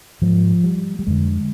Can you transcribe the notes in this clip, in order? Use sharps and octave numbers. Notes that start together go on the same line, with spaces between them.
G#2 F3
G3
G3
F2 D3 G#3